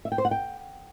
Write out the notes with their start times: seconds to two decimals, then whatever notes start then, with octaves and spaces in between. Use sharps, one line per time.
0.05 E5
0.12 G5
0.18 C5
0.25 F#5
0.31 G5